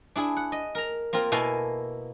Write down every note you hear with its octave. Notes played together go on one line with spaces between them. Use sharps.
D4 E4 G#4
F#5
D#5
A#4 A#5
A#3 C4 F4 A#4
B2 A#3 E4 A4 F5 G#5